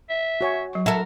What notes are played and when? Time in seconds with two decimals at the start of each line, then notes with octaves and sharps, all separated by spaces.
0.10 E5
0.41 F#4 C#5 G#5
0.73 F#3 C#6
0.86 E4 A4 A#4 F#5